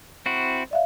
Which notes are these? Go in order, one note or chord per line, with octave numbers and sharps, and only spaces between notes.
C4 E4 F#4
D5 E5 F5